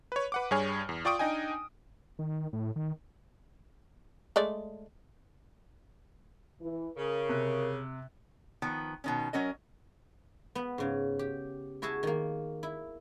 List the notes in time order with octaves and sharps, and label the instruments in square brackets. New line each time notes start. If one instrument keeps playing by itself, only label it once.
[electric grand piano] B4 C#5
B4 F#5 D6
G2 G3 G#4 C#5 G#5 F6
E2
F4 D5 G5 C#6 D#6 D7
D4 D#4 D#5 G5 G#5
[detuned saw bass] D#3
A2
D#3
[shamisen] G#3 A3 D5
[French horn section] E3
[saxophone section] C#3 [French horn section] A#4
[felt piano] C3 F#6
[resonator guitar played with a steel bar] D#3 F3 B3
B2 D#3 C#4
F#3 C#4 A#4 D#5
[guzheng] B3 B4
G#2 C#3
G4
E4 F#4 G#4 E5 A5
D#3 A#3
E4